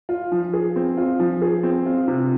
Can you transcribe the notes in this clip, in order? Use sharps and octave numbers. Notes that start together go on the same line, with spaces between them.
F4
F3
G#4
C4
F4
F3
G#4
C4
F4
C3